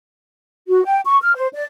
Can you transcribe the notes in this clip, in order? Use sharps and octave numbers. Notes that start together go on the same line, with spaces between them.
F#4
G5
C#6
F6
C5
D5